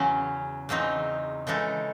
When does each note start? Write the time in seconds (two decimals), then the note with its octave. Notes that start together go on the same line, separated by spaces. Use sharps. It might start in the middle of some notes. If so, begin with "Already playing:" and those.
Already playing: E2 C#3 F#3 C#4
0.69 E2 C#3 F#3 C4 D#4
1.47 C#3 E3 G#3 D#4 A4